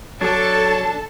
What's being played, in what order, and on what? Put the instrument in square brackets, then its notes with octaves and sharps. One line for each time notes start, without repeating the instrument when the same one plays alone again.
[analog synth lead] F#3 [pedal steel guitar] D4 [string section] A4 A5 [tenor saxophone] C#5